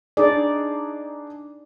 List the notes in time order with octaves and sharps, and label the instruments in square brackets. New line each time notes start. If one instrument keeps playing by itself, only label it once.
[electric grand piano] D4 D#4 G#4 [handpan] D5